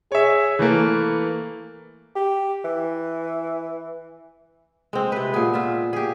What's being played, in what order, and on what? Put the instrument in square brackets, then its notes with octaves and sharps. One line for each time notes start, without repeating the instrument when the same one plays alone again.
[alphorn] G#4 [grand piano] C#5 E5
[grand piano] E3 A3 A#3 [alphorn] B4
[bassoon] G4
E3
[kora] G#3 C4
C3 B4
A#2 B3 G#4
F4 E5
G4 G#4